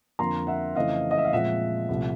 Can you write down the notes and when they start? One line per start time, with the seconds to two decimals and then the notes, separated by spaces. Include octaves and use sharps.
0.19 F2 D3 F3 A#3 A#5 C6
0.47 E5 F#5
0.75 F2 C#3 E3 A3 C4 D#5 F5
1.11 D#5
1.18 E5
1.25 F5
1.32 A#2 F3 G#3 C4 E5 F#5
1.89 C2 A#2 F3 A3